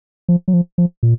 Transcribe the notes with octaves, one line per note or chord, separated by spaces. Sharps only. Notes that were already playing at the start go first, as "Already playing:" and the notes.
F3
F#3
F3
F3
A#2